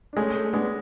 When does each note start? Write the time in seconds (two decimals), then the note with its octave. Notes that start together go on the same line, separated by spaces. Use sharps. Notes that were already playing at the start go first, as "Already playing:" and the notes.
0.13 D4
0.17 G#3 A3 C#4
0.35 A3 C#4
0.53 G#3 B3 D4